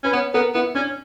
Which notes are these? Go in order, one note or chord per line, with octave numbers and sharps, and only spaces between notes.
C#4 B4
B3 C#5
B3 A#4
B3 E4
C#4 D4